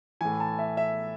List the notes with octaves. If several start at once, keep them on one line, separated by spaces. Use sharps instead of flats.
A2 E3 G#5
A5
E5
E5